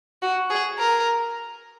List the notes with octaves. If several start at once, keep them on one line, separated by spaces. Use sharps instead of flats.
F#4
G#4
A#4